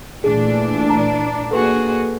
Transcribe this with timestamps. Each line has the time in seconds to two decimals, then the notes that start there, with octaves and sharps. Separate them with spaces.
0.24 A#2 E3 A3 D4 G#4
0.89 A5 A#5 D6
1.51 A#3 F#4 G#4 A4 B4